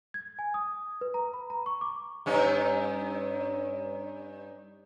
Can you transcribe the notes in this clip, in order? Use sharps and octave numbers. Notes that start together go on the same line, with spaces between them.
G#6
G#5
D#6
B4
A#5
B5
A#5
C#6
D6
G2 C#4 D#4